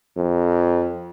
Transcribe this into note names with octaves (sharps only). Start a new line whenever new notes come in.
F2